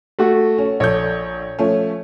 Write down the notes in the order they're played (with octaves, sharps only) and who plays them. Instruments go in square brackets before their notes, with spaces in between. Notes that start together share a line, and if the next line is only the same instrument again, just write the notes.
[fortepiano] A3 F#4
[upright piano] C#4
[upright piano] A#1 A4 G6 [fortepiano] C#5
[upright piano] F3 A3 C#4